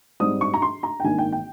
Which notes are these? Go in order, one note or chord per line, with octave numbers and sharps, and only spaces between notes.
G#2 G3 C4 D#4 D#6
C#6
A#5
C6
A#5
G5
G#1 G2 D#3 A#3 G#5
G5
G5